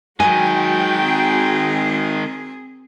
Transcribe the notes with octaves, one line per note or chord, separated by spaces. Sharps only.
D#3 F#3 G#3 F#4 G5 G#5
C4 G#4